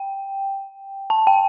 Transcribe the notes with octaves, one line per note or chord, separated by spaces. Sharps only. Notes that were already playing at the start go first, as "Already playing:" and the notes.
Already playing: G5
A5
G5